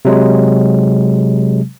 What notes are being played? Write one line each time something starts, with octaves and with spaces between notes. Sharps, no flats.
C3 F#3 G#3